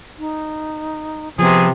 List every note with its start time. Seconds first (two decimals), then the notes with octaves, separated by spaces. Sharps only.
0.18 D#4
1.39 C3 F3 B3 G#4